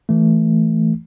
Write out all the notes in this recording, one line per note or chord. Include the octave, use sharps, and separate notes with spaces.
E3 A3